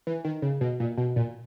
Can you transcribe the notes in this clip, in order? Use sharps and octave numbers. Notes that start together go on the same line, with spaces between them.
E3
D#3
C#3
B2
A#2
B2
A#2